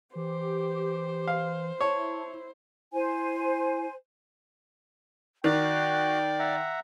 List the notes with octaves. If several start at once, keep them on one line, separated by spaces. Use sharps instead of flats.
E3 G4 C5
F5
E4 C#5 A5
E4 C5 G#5
D#3 F#4 D5 G5 F#6
E5 F#5 A#5